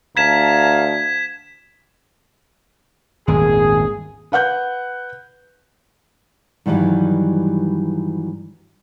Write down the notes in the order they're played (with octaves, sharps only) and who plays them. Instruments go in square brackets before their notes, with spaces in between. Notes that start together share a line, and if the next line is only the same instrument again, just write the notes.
[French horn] D2 [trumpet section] F5 A5 A#5 [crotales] G#6 B6 E7
[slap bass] D#1 G#1 [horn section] G#4
[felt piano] B4 F#5 F#6 G6
[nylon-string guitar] G2 D#3 E3 F#3 G3